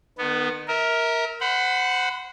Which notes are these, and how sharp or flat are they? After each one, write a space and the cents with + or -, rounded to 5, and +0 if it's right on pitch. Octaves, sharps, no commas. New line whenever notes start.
D#3 -40 B3 +0
A#4 +0 E5 -35
C5 -20 F#5 +0 B5 +20